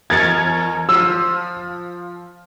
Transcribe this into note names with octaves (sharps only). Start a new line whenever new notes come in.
E2 A#4 G#6 A6 C#7
F3 E6